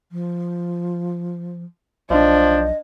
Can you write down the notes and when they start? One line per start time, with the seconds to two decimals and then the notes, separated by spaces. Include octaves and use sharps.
0.12 F3
2.10 B1 F3 D4 D#5